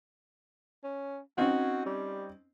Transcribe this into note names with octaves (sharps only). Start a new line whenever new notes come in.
C#4
C4 C#4 D#4 F#4
G3